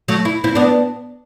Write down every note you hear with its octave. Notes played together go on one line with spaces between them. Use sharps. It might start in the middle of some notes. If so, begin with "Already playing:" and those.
F#3 A3
E4
C4 E4
B3 D4